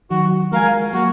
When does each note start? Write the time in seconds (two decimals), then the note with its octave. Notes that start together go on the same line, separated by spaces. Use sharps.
0.11 D#3 F#3 F#4
0.52 F3 G#3 A#4 F5 G#5
0.93 F#3 A#3 F#4